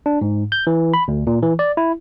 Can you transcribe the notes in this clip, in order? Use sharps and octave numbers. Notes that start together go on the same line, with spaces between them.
D4
G#2
G6
E3
B5
D2
A#2
E3
D5
E4